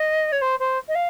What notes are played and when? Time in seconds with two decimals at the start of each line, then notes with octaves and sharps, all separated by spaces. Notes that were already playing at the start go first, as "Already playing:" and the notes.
Already playing: D#5
0.32 C#5
0.41 C5
0.59 C5
0.88 D#5
0.95 F5